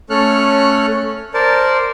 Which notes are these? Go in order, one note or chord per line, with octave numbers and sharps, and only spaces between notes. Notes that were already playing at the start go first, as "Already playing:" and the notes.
A3 C#4 A4 C#5 F6 F#6
A#4 C5 D5 A5